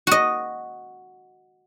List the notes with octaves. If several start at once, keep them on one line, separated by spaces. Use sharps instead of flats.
F#4 D#5